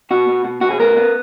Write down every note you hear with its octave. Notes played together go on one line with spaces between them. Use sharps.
B2 F#4
B2
B2
B2 F#4
G#4
B3 A#4
B3